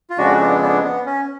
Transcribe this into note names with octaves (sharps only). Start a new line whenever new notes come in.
F4
F2 C#3 G#3 D4 F#4
B3 D4
B3 D4
B3
C#4